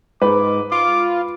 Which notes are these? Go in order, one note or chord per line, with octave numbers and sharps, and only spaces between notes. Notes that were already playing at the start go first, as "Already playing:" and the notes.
G#2 B4 D6
F4 D6